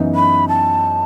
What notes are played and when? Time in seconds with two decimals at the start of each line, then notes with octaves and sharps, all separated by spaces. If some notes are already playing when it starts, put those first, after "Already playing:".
Already playing: F#2 E3 B3 D#4
0.15 B5
0.49 A5